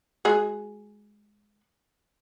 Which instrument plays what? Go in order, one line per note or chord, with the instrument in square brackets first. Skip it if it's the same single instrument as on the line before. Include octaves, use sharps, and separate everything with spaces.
[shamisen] G#3 F#4 G#4